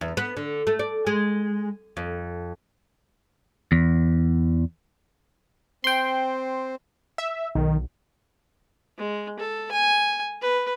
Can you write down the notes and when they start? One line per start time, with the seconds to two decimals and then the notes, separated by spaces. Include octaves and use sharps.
0.01 E2
0.17 B3
0.37 D3
0.67 A3
0.79 D5
1.07 G#3
1.97 F2
3.72 E2
5.84 C4 G5 C6
7.18 E5
7.55 B1 D#3
8.98 G#3
9.40 A4
9.72 G#5
10.41 B4